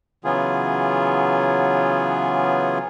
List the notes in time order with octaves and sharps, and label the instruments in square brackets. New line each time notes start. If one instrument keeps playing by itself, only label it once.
[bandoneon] C#3 E3 F#3 B3 F4 G#4